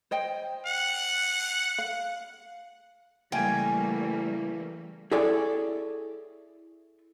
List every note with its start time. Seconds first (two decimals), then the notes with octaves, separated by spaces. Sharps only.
0.11 C5 D#5 G5
0.66 F#5
1.78 F5
3.32 C#3 E3 G3 A3 A#3 G5 G#5
5.11 E4 G#4 A4 C#5 D5 G#5